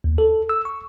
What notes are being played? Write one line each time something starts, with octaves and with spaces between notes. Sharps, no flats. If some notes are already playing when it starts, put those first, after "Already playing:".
D#2
A4
E6
C#6